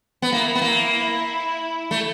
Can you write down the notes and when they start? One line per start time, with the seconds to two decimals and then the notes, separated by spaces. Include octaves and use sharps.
0.22 B3
0.32 A#3 E4
0.55 B3
0.62 A#3
1.91 A3